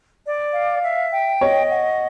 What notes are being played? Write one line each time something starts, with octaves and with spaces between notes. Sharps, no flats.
D5
F5
E5
G5
C#5 D#5
F#5